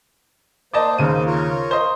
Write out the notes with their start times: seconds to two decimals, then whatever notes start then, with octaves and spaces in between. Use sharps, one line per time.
0.73 A#3 C5 D5 D#5 A5
0.98 D#2 C#3 D#7
1.26 F4 A#4 C#5
1.71 C5 D#5